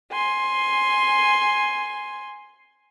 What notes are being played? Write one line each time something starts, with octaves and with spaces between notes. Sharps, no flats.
G#5 C6